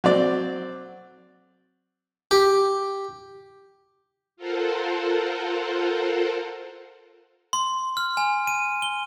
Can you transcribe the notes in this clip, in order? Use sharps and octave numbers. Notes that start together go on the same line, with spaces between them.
F#3 C4 D5
G4
F4 A4 A#4 C5 F#5
C6
F6
G#5
D#7
G7